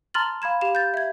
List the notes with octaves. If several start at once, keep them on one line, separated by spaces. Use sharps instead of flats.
A5 A#5 C6 F6 A6 F#7
F5 B5 G#6 E7
G4 F5 E7
G6 A6
E5 G#6